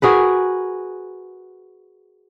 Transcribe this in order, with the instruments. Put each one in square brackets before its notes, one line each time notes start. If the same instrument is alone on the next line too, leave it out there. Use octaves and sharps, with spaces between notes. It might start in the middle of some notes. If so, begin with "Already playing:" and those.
[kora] F#4 G#4 A#4 B4